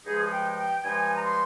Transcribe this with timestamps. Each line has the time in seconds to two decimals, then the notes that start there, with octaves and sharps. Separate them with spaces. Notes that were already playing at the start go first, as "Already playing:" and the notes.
0.05 G2 F3 G#3 D#4 G#4
0.31 G5
0.57 G5
0.83 G2 F3 G#3 D#4 G#5
1.15 A#5
1.23 C6